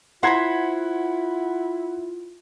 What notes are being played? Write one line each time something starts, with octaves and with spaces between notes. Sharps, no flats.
E4 F4 C5 F#5 A#5 B5 G#6